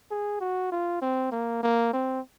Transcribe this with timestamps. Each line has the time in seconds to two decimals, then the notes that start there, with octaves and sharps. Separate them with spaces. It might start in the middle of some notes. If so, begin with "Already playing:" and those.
0.11 G#4
0.41 F#4
0.72 F4
1.02 C4
1.32 A#3
1.63 A#3
1.93 C4